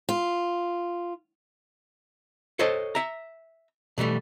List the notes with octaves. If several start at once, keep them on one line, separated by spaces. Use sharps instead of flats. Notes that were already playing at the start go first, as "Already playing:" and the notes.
F4
A4 C5 C#5 D#5 G5 A5
E5 A#5
B2 E3 G3 A3